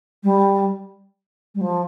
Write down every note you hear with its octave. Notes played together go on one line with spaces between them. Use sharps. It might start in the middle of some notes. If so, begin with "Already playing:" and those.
G3
G3
F3